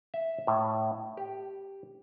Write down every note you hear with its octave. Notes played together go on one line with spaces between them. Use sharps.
E5
A2
G4